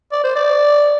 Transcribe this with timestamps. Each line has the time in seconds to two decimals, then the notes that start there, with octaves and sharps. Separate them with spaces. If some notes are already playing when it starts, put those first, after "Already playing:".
0.12 D5
0.24 C5
0.36 D5